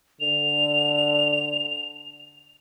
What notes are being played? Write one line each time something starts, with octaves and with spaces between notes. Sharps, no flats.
D3 F7